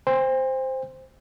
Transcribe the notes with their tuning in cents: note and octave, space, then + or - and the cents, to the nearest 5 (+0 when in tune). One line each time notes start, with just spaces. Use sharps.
C5 +0 G5 +45